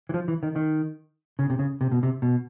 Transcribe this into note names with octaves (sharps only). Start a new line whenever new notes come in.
E3
F3
E3
D#3
D#3
C#3
C3
C#3
C3
B2
C3
B2